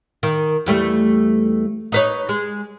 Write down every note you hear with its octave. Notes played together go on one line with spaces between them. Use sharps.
D#3
E2 G3 A3
D#4 B4 C#5
G#3